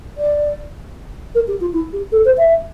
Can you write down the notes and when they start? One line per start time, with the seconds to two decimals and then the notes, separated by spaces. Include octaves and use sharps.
0.18 D5
1.35 A#4
1.48 G4
1.60 F4
1.73 E4
1.93 G4
2.12 A4
2.25 C5
2.38 E5